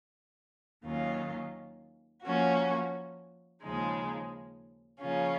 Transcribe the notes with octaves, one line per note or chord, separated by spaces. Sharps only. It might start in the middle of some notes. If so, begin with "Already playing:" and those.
D#2 D#3 F#3 C#4 F4
F3 A#3 C#4 F#4
D#2 C#3 F3 G#3 D#4
C#3 F3 A#3 C#4 F4